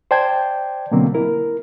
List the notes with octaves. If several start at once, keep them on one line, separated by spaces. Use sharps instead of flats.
C5 D5 G5 A5 G6 G#6
B2 D3 F#3 A#3 C4
E4 A#4